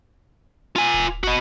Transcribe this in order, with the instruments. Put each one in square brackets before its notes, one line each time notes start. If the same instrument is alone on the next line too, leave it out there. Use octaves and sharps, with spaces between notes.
[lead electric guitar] F4 G#5
[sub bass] D1
[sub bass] F#1 [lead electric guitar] F#4 D#5